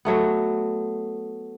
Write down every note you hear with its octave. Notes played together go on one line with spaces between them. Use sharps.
F#3 A3 B3